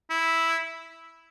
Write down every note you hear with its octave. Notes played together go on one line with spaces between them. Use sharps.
E4